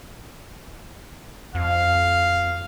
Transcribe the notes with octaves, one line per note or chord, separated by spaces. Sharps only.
F2 F5